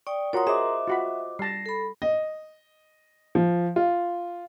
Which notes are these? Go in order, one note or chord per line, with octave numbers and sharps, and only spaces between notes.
D5 G5 C#6 D#6
F4 F#4 A#4 C#5 A#5 C6 D#6
G#4 C5 D#5 E5 D6
F4 F#4 B5
G3 A5 A#6 C7
A4 B5
D#5
F3
F4